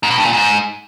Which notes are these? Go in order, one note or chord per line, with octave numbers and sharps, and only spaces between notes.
G#2
B2
G2
A#2
G#2